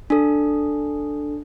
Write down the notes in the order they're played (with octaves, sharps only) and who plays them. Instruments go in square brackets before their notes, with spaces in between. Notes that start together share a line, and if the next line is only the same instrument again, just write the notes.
[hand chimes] D4 A4